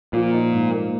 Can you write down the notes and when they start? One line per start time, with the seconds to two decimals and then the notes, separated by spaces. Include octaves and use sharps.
0.13 A#2 F3
0.33 D#4
0.52 G#2
0.73 A#3